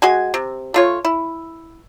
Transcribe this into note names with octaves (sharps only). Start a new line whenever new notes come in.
G#3 F#4 G#5
C3
A3 F4 C#5
E4